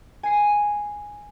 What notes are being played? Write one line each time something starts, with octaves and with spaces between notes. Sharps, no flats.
G#5 C7 D#7